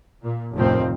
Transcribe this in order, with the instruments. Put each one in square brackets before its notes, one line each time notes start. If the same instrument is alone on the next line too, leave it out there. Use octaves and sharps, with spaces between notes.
[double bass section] A#2
F1 D2 A2 D#3 F3 C4